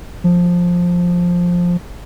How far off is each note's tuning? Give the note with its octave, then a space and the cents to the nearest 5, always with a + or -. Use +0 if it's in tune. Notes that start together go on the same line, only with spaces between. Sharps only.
F3 +10